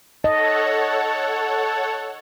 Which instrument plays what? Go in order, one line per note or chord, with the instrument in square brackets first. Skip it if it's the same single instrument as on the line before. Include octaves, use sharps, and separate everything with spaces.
[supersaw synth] A4 C#5 F#5 [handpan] D#5 [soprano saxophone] A5